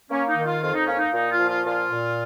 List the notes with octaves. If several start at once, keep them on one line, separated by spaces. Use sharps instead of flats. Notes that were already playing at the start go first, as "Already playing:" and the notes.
A#3 C#4
D#4
D#3
F4
F2 F4
D#4
A#3 C#4
D#4
A#2 D#4
F4
F3
F4
A#2 F4
A#2